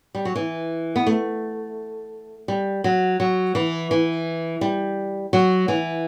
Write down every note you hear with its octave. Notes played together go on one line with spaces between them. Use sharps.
G3
F#3
E3
B3
A3
G3
F#3
F#3
E3
E3
G3
F#3
E3